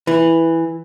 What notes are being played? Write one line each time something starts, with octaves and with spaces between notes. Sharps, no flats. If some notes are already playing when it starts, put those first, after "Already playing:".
E3